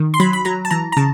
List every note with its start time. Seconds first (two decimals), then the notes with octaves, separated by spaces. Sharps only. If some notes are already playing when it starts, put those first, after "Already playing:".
Already playing: D#3
0.14 C6
0.20 F#3 B5
0.33 B5
0.45 F#3 A#5
0.65 A5
0.71 E3 A#5
0.92 A#5
0.97 C#3 A5